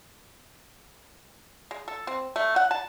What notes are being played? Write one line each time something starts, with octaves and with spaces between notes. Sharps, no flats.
G#3
A4
C4
A3
F#5
A5